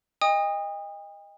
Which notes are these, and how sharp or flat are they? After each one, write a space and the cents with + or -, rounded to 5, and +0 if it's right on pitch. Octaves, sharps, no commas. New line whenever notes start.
D#5 +0 G5 +45 D#6 -5